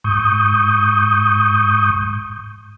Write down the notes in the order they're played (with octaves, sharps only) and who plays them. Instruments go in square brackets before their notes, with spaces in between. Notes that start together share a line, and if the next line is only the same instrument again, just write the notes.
[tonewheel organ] G#2 C#6 D#6 G6